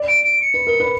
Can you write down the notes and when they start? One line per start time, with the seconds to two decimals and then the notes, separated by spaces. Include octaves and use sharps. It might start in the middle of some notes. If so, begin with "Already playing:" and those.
Already playing: D5
0.08 D7
0.24 D7
0.42 C#7
0.54 B4
0.67 A#4
0.80 B4